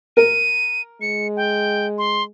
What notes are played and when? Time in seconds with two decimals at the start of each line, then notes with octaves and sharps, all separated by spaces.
0.17 A#4 D#7
1.01 G#3 C#7
1.36 G5
1.98 C6